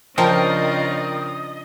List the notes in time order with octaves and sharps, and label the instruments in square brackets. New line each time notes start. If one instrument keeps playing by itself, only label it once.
[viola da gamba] C#3 D4 F4 [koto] F3 [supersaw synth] A#4 G5 [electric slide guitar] D#5